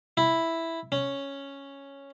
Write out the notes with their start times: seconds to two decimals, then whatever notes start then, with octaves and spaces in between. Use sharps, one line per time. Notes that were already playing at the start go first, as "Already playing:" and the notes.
0.17 E4
0.92 C#4